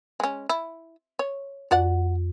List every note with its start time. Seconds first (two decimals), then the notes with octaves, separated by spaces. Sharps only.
0.20 G#3 C#4
0.49 E4
1.19 C#5
1.71 F2 F#4 D5 F#5